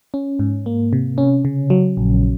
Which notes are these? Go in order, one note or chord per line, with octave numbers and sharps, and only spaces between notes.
C#4
G#2
A#3
C3
C#4
C#3
F#3
A#1